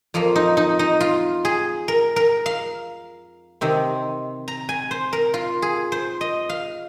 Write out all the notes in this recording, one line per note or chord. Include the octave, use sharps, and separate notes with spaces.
F2 F3 A#3 F4
D#4
D#4
D#4
F4
G#4
A#4
A#4
F5
C3 D#3 C4
A#5
G#5
C5
A#4
F4
G#4
C5
D#5
F5